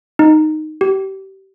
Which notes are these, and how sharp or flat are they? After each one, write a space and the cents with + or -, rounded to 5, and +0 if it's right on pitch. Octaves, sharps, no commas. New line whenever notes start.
D#4 -5
G4 -25